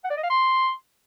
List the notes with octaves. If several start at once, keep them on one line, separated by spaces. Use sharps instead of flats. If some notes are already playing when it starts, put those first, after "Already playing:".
F#5
D5
D#5
F5
C6